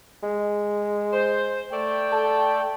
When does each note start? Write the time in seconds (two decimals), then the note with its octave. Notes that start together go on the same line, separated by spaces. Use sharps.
0.23 G#3
1.13 C5
1.72 A3 D5 G5
2.12 A4